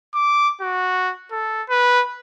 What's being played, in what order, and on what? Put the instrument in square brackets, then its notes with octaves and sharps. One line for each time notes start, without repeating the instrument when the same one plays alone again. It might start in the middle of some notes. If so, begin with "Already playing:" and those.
[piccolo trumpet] D6
F#4
A4
B4